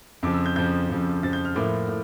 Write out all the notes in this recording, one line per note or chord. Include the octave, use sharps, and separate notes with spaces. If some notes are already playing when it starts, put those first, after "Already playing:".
F2 C#3 F3 D6
E6
G6
F2 C#3 F3 G6
F2 C#3 F3
F2 C#3 F3 A6
G6
F6
A2 F3 A#3 E4 D6
A2